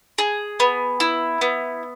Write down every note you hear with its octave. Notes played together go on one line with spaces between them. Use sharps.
G#4
B3
E4
B3